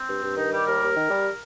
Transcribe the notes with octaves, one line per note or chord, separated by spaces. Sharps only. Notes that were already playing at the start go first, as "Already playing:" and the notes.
Already playing: C4
G2
G2
D#3 D#4
G3 G4
D#2 A#4
D#2
D#3
G3